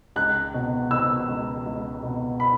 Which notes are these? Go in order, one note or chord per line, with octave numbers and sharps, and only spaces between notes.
C#2 F#6
B2
B2 E6
C#2
C#2
B2
B5